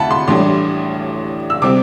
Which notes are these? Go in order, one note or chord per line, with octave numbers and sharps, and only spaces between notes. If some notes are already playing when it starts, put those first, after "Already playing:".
Already playing: D2 E5 F#5 A5 B5
C6
A1 A2 E3 G3 D4 C6
E6
C3 G3 C4 D6